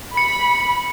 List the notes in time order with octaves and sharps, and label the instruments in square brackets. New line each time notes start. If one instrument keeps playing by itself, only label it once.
[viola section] B5 [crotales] C#7